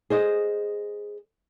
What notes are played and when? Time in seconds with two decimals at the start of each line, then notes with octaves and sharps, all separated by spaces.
0.10 G#4 C5 D#5